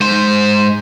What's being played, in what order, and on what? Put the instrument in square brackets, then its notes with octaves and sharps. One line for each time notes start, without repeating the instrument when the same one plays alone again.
[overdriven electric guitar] G#2 C5